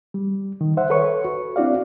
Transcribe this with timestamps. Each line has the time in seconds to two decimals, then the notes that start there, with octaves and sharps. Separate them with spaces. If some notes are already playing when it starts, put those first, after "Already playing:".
0.14 G3
0.61 D#3
0.77 C5 E5 F#5
0.90 A4 B4 C#5 C#6
1.25 F#4
1.56 C4 D4 E4 F#4 D5 F5